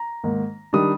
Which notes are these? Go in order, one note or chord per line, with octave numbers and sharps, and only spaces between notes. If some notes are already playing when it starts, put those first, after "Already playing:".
Already playing: A#5
G#2 D#3 A#3
D#3 G3 D4 D#6